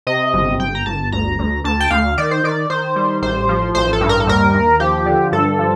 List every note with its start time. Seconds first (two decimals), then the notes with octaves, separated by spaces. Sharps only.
0.07 C3 D#5
0.34 G1
0.59 G1 G5
0.75 A#5
0.86 G1 A5
1.12 D2 A#5
1.39 D2
1.64 D2 A5
1.80 G5
1.90 D2 F5
2.18 D#3 D5
2.31 C5
2.44 D#3 D5
2.70 D#3 C5
2.96 G3
3.22 A1 C5
3.49 F3
3.75 A1 C5
3.93 A4
4.01 G2
4.09 A#4
4.20 A4
4.27 D#2 A#4
4.54 D#2
4.80 F3 G4
5.06 D3
5.32 G2 A4
5.59 F3